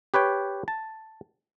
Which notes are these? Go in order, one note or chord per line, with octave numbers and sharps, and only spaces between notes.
G4 B4 C#5 G5
A5